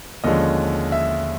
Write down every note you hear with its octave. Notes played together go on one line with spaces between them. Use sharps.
D#2 D3 F3 G#3 C#4 D#5
E5